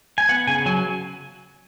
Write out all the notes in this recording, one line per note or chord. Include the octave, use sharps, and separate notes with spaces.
G#5
B3 F#5
C#3 G#5
F#3 G#5